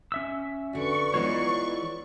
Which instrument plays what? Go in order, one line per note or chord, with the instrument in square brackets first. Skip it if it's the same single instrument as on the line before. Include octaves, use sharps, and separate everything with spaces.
[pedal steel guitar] C#4 E5 E6
[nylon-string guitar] D3 F#4 [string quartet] B4 D5 [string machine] C#6
[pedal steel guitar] E3 F4 C#5 [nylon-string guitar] G#3 B3 D#4